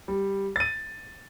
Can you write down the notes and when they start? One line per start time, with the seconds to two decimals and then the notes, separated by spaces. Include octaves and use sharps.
0.08 G3
0.56 A6 D#7